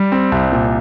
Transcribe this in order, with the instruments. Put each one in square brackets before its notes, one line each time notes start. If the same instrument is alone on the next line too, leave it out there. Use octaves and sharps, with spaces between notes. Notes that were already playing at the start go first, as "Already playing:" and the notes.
Already playing: [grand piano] G3
C4
C2
A#2